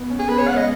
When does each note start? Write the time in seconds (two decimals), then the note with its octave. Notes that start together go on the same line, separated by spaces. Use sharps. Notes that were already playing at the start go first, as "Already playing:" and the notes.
Already playing: B3
0.10 C#4
0.19 G#4
0.29 B3 B4
0.38 C#5
0.48 G#3 F#5
0.57 D#5